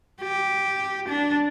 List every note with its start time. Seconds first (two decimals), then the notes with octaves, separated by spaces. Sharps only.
0.22 G4
1.08 D4